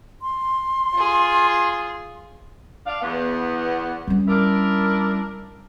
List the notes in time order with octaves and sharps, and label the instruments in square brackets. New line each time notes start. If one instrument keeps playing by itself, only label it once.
[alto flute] C6
[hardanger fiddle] F4 G#4
[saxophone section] D4 F5
E2 B3
[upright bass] G3 C#4
[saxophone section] D4 E4 A#4